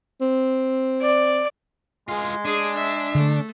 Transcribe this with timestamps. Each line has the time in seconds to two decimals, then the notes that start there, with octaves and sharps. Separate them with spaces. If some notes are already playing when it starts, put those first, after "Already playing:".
0.21 C4
1.01 D5
2.09 G#3 F4 G#4
2.45 D4 G#4 G#5
2.75 E5
3.15 D3 A3